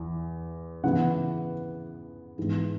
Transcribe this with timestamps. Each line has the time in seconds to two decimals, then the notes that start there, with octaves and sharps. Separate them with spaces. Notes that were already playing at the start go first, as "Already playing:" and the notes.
Already playing: E2 E3
0.84 C#3 E3 B3 F#5
2.38 G#2 E3 G#3 B3